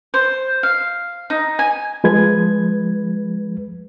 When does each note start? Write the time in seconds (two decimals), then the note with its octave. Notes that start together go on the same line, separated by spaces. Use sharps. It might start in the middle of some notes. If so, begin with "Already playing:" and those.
0.14 C5
0.63 F5
1.30 D#4
1.59 G#5
2.04 F3 G#3 B4 G#6